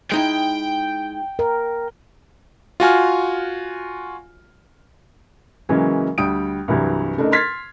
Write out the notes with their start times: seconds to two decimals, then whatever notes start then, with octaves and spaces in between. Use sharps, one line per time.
0.12 G#3 D#4 E4 G5
1.39 A#4
2.80 F4 F#4 G#5 F6
5.69 C#3 E3 F#3 G#3 A#3 C#4
6.18 D2 G3 G5 D#6 D7
6.68 C2 G2 E3 F#3
7.17 C#3 A3 D4 D#4 A#4
7.32 C6 F6 G#6 A6 B6 C7